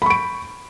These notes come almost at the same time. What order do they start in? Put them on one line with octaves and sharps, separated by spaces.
B5 C#6 D7